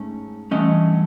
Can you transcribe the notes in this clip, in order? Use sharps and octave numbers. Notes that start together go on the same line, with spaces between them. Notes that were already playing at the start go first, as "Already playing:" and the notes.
Already playing: G#2 A3 C#4
G2 E3 A3 C#4 D#5